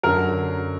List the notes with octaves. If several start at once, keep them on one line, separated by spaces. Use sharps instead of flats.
F#2 D3 F#3 A#4